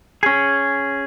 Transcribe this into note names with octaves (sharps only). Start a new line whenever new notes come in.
C#4 G#4